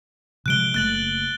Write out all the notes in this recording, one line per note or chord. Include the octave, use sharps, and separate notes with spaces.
C3 F3 G#3 F#6 D7 G7
F#1 A3 F#6 A6 F#7